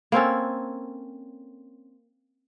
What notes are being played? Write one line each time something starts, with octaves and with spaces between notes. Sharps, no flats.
A#3 C4 C#4 A4